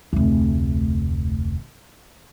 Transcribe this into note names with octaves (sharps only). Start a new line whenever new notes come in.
F1 D2